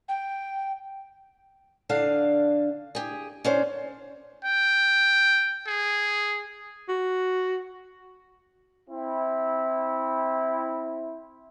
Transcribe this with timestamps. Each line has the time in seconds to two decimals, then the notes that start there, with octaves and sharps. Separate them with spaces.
0.08 G5
1.89 D3 D4 F5
2.95 G4 G#4
3.45 C#4 D4 C5
4.45 G5
5.67 G#4
6.89 F#4
8.88 C4 E4